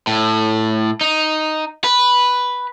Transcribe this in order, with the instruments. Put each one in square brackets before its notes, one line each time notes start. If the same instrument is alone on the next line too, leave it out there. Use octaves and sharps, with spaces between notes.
[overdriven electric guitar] A2
D#4
B4